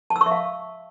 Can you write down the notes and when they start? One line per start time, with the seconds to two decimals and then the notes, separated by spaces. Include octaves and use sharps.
0.10 A5
0.16 E6
0.21 C#6
0.26 E5
0.31 F5